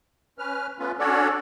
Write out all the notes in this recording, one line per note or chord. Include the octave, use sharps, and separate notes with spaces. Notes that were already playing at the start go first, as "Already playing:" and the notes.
C#4 B4 F6
A3 B3 C#4 F4 B4
C#4 D4 F#4 A4 C#5 D5